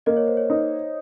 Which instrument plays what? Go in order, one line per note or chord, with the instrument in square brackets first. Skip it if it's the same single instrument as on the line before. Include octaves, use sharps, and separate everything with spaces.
[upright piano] A#3 [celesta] D#5
[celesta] C#5
C5
C#5
[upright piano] D#4